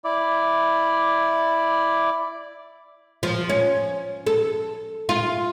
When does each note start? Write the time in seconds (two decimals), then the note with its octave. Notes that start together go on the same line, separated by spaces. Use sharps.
0.04 E4 D5
3.23 F3
3.49 C#4
4.27 A4
5.09 F4